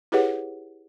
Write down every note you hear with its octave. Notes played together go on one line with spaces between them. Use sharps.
E4 G4 G#4 B4 C#5 F#5